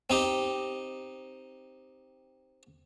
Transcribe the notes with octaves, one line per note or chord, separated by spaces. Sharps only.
C4 D#4 G4